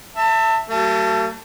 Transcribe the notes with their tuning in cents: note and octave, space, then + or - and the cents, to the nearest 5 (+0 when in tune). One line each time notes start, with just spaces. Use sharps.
E5 -5 A5 +30
F#3 +40 A3 +45 A5 +0